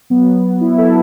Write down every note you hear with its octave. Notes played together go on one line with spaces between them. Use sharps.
F#3 B3
B3 E4
E4 A4